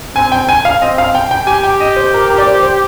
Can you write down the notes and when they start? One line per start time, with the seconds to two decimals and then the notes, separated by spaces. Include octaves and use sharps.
0.16 C4 G#5
0.32 G5
0.49 G#5
0.65 F5
0.82 C4 D#5
0.98 F5
1.15 G5
1.31 G5
1.47 G4 G#5
1.63 G5
1.80 D#5
1.96 C5
2.14 A#4
2.30 A#4
2.38 D5
2.47 C5
2.63 C5